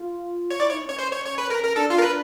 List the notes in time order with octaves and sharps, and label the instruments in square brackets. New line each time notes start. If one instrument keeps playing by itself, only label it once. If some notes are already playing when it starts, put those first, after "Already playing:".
Already playing: [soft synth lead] F4
[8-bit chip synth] C#5
[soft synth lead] E4 [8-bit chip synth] D5
[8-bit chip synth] C#5
[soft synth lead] D#4
[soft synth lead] C#4 [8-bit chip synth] C#5
[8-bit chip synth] C5
C#5
C#5
B4
A#4
A#4
[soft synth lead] D4 [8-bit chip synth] A4
[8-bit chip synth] F4
A#4
B4